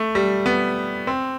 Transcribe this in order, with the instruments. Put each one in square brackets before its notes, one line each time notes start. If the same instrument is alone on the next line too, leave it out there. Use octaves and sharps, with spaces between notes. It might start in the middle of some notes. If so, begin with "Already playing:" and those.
Already playing: [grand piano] A3
G3
B3
C4